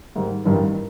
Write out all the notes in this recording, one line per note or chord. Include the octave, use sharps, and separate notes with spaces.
G#2 D#3 G3
A1 G2 D#3 G3